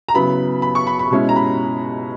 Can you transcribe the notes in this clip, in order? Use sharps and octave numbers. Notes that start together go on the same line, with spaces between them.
A#5
C#3 F#3 B3 E4 B5
B5
C#6
B5
B5
B2 G#3 C#4 E4
A#5
B5